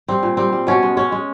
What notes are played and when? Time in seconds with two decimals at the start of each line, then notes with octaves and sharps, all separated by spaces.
0.08 G3 C4
0.23 A#2
0.37 G3 C4
0.52 G3
0.67 B2 C#4
0.83 G#3
0.97 G#3 C#4
1.12 G#3